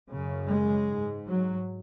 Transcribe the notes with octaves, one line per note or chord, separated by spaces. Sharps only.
F#2 C#3
G#3
G#2
F#3